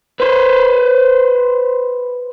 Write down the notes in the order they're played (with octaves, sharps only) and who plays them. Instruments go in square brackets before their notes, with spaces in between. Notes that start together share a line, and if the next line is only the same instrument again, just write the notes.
[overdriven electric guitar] B4 C5